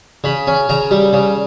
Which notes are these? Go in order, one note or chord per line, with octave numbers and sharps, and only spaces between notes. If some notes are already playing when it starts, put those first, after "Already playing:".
C#3 B5
C#4
C#3 A#5
G3
C#3